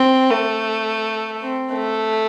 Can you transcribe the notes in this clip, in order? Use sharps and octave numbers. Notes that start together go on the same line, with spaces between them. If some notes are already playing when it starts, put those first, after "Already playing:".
Already playing: C4
A3
C4
A3